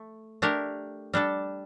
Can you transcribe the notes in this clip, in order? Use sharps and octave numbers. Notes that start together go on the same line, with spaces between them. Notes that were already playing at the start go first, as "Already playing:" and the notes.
Already playing: A3
A3 D4 G4 A#4
G3 D4 A4